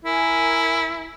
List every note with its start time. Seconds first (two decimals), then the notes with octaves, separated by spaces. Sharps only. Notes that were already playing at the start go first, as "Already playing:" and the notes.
0.05 E4 A#4 G#5